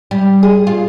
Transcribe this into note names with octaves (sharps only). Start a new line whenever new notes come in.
G3
G#4
F4